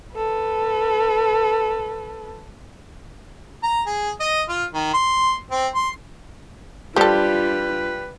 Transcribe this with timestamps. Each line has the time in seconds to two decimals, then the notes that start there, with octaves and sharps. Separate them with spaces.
0.16 A4 B4
3.63 A#5
3.86 G#4
4.20 D#5
4.49 F4
4.74 D#3
4.94 C6
5.51 C4
5.75 C6
6.96 F3 G3 D4 F4 G4 A4 B4